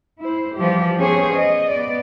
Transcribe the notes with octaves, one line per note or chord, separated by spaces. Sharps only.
E4 C5
E3 F3 G3 G4
B3 C#4 G#4 C5 C#5
D#5
B3 D5